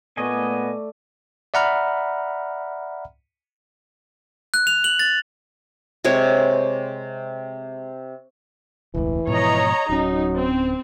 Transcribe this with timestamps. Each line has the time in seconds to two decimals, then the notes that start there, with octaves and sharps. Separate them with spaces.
0.17 A#2 A3 B3 D5 D#5 G#5
1.54 D5 E5 F#5 A#5 B5 F6
4.54 F#6
4.67 F7
4.84 F#7
4.99 A6
6.04 C3 G#3 C#5
8.94 E1 C#2 A2 E3
9.27 G#2 B2 F3 C#5 D#5 A#5
9.89 D1 F#3 C#4 D#4
10.36 C4